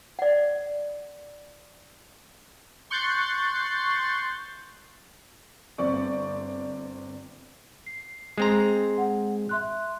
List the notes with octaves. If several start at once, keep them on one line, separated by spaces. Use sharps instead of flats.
D5 F#5
C6 C#6 F#6 G6 A6 C7
G1 C4 D5 C#6
C7
G#3 C4 A#5 C6 C7
F#5
E5 C6 F#6